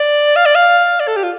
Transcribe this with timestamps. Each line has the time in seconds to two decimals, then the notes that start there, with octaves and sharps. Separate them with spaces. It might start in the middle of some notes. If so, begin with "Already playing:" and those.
Already playing: D5
0.36 F5
0.46 D5
0.55 F5
1.00 D5
1.07 A4
1.16 G4
1.23 F4